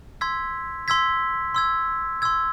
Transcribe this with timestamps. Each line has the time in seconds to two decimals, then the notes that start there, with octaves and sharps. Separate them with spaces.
0.21 C6 E6 G#6 B6
0.88 C6 E6 G#6 B6
1.54 C6 E6 G#6
2.22 C6 E6 G#6